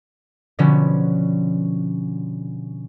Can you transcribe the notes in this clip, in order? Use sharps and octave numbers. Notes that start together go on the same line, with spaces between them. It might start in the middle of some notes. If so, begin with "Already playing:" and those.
B2 D3 F3 B3 C#4